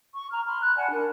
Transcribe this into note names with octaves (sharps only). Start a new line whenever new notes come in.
C#6
A#5 F6
B5 C6 F6
B5 F#6
D5 F#5 G#5 A5
D4 A#4